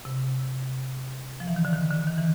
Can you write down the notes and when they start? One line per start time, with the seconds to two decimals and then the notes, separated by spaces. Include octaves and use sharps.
0.05 C3
1.40 F3
1.47 E3
1.56 D#3
1.65 D3
1.73 D#3
1.91 D3
2.07 D#3
2.18 E3